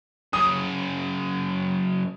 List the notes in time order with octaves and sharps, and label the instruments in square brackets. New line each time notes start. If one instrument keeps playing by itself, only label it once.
[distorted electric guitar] F#2 C#3 [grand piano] D#6